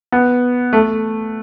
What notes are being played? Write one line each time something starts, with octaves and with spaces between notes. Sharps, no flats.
B3
A3